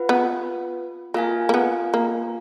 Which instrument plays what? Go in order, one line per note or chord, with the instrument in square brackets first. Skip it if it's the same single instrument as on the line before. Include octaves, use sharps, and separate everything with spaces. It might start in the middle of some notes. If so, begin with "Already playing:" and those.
Already playing: [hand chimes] F4 B4 F#5
[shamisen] B3
[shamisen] A#3 [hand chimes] F4 A#4 F5 G#5
[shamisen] A#3
B3
A#3